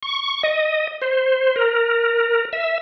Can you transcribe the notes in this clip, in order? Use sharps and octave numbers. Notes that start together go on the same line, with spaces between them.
C#6
D#5
C5
A#4
E5